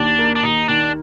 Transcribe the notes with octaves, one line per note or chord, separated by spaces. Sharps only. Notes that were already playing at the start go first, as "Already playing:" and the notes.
Already playing: D#2 D#3 D4
A#3
D4
D#2 D#4
D#3 D4